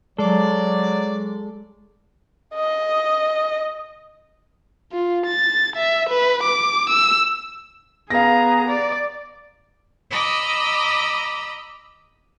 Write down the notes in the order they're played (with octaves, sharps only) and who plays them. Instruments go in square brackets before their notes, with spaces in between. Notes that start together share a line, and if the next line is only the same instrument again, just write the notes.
[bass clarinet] F#3 [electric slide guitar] G#3 A4 [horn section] D5
[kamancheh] D#5
[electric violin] F4
A6
E5
B4
D6
E6
[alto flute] B3 [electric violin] G#4 A#5 [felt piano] F5 A#6
[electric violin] D5
[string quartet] D#5 A#5 B5 D6 E6